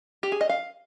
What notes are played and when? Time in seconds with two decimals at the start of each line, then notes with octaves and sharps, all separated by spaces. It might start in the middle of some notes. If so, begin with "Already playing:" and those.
0.23 G4
0.32 G#4
0.41 D#5
0.49 F5